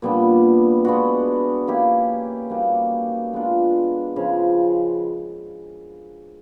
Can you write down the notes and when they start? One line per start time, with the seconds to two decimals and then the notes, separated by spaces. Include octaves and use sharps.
0.02 A#2 G3 B3 D4
0.85 G#3 B3 D4 F#4
1.68 A#3 C#4 E4 G4
2.50 G3 A#3 D#4 F#4
3.33 G#3 B3 D4 F4
4.16 C#3 F3 G#3